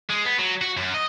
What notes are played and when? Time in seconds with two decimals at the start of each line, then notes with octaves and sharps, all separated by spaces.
0.10 G#3
0.25 B3
0.39 F#3
0.61 F#4
0.77 F#2
0.94 D#5